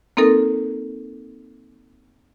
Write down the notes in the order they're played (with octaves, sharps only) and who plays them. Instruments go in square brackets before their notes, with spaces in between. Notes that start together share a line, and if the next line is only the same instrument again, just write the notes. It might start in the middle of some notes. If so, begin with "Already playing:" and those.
[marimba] A#3 C4 D#4 A4 A#4